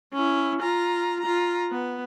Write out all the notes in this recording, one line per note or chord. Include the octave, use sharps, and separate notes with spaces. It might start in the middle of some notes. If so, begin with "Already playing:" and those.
C#4 E4
F4 A#5
F4 A#5
B3